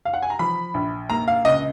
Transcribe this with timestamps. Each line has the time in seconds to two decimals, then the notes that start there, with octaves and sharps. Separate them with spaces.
0.05 F5
0.14 F#5
0.22 G#5
0.30 A#5
0.39 F3 B5
0.74 A#1
1.10 A#3 A#5
1.28 F5
1.45 C#2 D#5